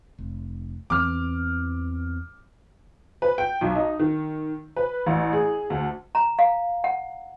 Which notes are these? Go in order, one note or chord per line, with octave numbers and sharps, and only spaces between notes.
F1
E2 E3 C4 D6 F6
B4
G5
B1
D#4
D#3
B4
A1
G#4
D2
A#5
F5
F#5